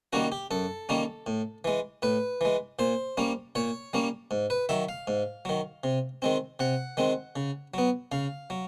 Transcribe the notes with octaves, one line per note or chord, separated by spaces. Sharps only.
D#3 G3 A#3 C#4 F#4
G4
F#2 A4
D#3 G3 A#3 C#4
A2
E3 G#3
A2 B4
E3 G#3
A#2 C5
G3 A#3 C#4
A#2 C#5
G3 A#3 C#4
G#2
B4
D#3 F#3 E5
F5
G#2
D#3 F#3
C3
D#3 G#3 C4
C3 F#5
D#3 G#3 C4
C#3
F#3 B3
C#3 F5
F#3